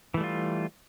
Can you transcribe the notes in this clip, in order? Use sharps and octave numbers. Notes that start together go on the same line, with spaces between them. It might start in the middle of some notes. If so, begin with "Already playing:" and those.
E3 G3 A3 F4